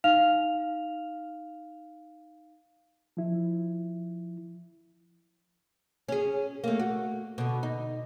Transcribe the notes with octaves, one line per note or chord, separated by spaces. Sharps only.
D#4 F5 F6 F7
F3 E4
C#4 G#4
A3 A#3
F#4
B2 D3
D#4